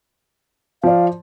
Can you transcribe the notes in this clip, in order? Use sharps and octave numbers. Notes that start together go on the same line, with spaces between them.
F3 D5 F5